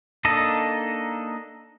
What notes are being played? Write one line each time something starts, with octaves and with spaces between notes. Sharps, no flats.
A#3 D4 D#4 A4 D#5